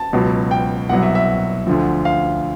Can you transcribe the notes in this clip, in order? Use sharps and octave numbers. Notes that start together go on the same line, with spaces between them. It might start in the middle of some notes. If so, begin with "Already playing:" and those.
Already playing: A5
C#2 B2 F#3
G5
C2 B2 F#3 F#5
E5
E5
D2 D3 F3
F5